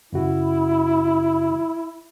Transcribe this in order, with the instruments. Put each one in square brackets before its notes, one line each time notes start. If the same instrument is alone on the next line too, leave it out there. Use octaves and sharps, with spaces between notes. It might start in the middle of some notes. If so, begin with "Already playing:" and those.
[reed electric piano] F#2 C#3 F#4 [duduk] E4